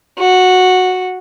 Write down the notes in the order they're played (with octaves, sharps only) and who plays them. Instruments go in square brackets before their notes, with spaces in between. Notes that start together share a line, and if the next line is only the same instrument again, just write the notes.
[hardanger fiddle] F#4